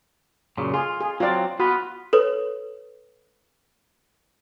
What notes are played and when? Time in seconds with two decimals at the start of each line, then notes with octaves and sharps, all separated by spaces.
0.57 F#2 A#2 C#3
0.74 F4 G#4
1.00 G#4
1.20 F#3 C4 F4 D5
1.60 B3 F4 F#4 B4
2.13 A4 B4 C#5